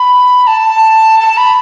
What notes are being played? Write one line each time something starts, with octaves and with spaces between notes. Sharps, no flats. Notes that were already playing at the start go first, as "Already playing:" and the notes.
Already playing: B5
A5
A5
B5